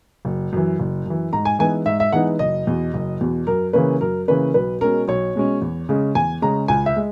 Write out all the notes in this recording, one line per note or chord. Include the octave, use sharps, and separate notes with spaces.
F#1
F#2 E3
F#1
F#2 E3
G#2 A#5
G#5
E3 G#3 B3 D#4 G#5
G#2 E5
E5
E3 G#3 B3 D#4 F#5
F#1 D#5
E2 B2
F#1
E2 B2
F#2 A#4
C#3 E3 A#3 C#4 B4
F#2 A#4
C#3 E3 A#3 C#4 B4
B1 B4
B2 G#3 C#4 A#4
B1 C#5
B2 G#3 C#4
E2
C#3 G#3 C#4
E2 G#5
C#3 G#3 C#4 A#5
C#2 G#5
E5
G#3